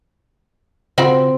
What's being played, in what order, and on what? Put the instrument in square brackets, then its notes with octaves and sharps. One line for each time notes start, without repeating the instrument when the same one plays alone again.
[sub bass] C#3 [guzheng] C4 [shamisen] F4 F#4 B5